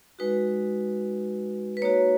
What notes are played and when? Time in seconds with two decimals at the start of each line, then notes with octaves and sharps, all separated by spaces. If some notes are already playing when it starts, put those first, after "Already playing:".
0.19 G#3 D#4 F#4 B4
1.77 B4
1.82 A#3 D#4 F#4 C#5